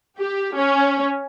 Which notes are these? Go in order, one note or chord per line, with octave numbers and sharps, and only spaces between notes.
G4
C#4